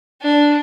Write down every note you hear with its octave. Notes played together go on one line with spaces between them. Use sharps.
D4